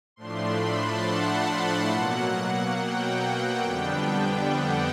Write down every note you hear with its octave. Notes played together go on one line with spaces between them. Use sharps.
A2 F3 A3 D4 C6
B5
A5
F#5
B2 F#3 A#3
G5
F2 D3 G3 B3 D4
F#5